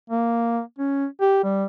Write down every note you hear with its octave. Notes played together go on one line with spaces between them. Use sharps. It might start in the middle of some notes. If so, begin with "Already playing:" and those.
A#3
C#4
G4
G3